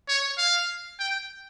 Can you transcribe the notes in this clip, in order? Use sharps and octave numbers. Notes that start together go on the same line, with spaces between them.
C#5
F5
G5